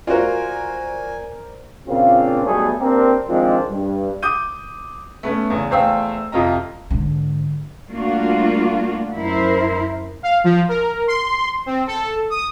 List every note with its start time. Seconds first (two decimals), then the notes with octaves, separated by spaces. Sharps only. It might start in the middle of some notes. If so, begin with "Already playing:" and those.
0.07 F4 F#4 A#4 C5 D5 G#5
1.87 A#2 C#3 A#3 C4 D4 F4
2.44 B1 B2 G3 A3 G#4 A4
2.79 A#3 C4 D4 G4 A#4
3.28 D#3 F3 G#3 C4 D4
3.68 G2
4.22 D6 D#6 G6 D#7
5.23 A3 B3 C#4
5.50 E2 C#3
5.71 E2 A3 C5 F5 G5 E6
6.32 F2 C3 F4 D#5 A#5
6.90 G#2 D3
7.88 G3 A3 A#3 D4 F4 F#4
9.15 F#2 E4 A#4 C5
10.23 F5
10.44 F3
10.69 A#4
11.08 C6
11.66 C4
11.87 A4
12.30 D#6